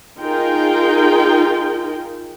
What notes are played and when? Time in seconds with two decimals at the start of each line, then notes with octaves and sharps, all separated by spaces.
0.20 D#4 F4 G#4 A#4 G5